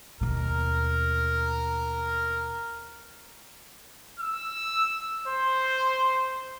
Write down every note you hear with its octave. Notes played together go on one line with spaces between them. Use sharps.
D#2 B2 A#4
E6
C5